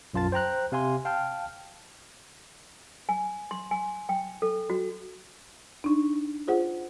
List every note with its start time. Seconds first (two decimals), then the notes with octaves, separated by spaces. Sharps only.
0.13 B1 F#2 F4 A5 A6
0.32 C5 G5 A#5 F#6
0.72 C3 F5 G#5 C6
1.05 F5 G5 A5 F6
3.09 G#5
3.51 C6
3.71 G#5
4.09 G5
4.42 A4
4.70 F#4
5.84 D4 D#4
6.48 F4 G#4 C5 F#5